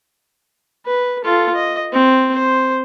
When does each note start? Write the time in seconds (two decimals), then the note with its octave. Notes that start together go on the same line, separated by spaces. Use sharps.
0.86 B4
1.25 F4 A4
1.55 D#5
1.93 C4
2.33 C5